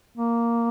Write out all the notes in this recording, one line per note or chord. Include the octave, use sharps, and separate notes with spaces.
A#3